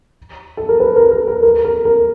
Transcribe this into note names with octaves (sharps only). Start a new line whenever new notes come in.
A4
A#4
B4
A#4
A#4
A#4
A#4
A#4
A#4